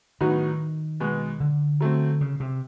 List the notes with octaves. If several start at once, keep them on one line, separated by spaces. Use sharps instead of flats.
A2 D#3 F#3 B3 D#4 F#4
B2 G#3 B3
D3
F#3 A3 C4
C#3
C3